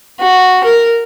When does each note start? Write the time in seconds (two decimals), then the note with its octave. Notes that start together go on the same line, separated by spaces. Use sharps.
0.20 F#4
0.64 A#4